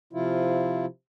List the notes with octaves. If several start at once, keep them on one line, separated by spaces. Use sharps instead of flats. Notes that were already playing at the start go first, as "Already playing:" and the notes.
C3 F3 E4 F4